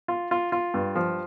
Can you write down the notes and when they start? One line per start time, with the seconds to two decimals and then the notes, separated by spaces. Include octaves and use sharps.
0.08 F4
0.31 F4
0.52 F4
0.74 G2
0.95 F3